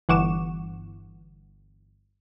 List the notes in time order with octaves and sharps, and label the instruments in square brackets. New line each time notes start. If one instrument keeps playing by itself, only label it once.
[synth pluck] G1 E3 F#5 C#6 D6 E7